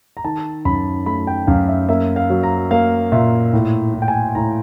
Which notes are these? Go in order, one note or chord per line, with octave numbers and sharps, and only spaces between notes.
A#5
D#3 A5
F#2 B5
A3 B5
G5
F#2 F5
E5
A#3 E5
F5
F#3
A#5
A#3 F5
A#2 E5
A2
A2
G5
G#5
A2 A#5